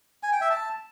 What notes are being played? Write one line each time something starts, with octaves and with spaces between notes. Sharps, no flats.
G#5
G5
E5
A5